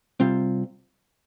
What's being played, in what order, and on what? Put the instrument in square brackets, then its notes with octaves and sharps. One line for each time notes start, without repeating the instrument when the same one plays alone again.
[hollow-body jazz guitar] C3 G3 C4 F4